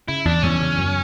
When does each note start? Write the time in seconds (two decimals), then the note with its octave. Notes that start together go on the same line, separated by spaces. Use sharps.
0.08 C#3 E4
0.25 E2 D4
0.43 E2 C#4
0.61 C#3
0.78 F#2